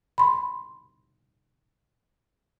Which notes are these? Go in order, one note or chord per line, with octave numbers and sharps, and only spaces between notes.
B5 C6